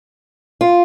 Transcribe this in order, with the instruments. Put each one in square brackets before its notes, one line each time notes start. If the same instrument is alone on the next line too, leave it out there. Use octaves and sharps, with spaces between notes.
[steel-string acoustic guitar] F4